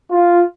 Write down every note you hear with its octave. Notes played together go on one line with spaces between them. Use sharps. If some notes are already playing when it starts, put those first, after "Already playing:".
F4